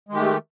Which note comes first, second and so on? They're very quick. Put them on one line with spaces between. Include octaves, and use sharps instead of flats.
G#3 D#3 G4 A3